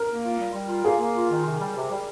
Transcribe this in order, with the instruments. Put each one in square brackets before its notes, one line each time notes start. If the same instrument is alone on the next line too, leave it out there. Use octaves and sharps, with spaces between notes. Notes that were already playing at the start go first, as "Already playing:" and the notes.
Already playing: [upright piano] A#4
[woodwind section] A#3
F4
G3
G3
F4
[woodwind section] A#3 [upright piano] G#4
[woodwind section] A#3
F4
D#3
C3
G3
C3
G3